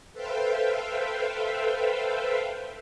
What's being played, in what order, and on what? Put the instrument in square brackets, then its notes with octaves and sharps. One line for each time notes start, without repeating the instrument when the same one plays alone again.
[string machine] A4 B4 C5 E5 F5 G5